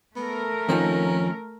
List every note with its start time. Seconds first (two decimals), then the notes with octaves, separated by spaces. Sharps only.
0.16 A3 B3 A#4
0.69 F2 D#3 F3 C#4